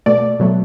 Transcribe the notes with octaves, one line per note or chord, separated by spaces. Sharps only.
B2 A3 D5
B2 F#3 A3